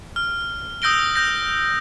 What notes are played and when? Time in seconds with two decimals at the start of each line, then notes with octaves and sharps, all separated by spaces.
0.16 F6
0.82 D#6 E6 G6 A#6 D7 G7
1.16 G6 A#6